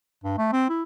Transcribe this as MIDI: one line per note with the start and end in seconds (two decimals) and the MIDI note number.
0.24 0.36 43
0.38 0.48 57
0.52 0.68 60
0.69 0.83 64